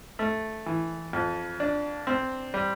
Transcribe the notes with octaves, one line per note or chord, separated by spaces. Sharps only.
A3
E3
F2
D4
C4
G3